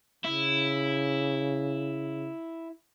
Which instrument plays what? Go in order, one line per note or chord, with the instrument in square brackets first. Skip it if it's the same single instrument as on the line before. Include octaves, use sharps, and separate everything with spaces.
[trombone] C#3 [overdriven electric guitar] E4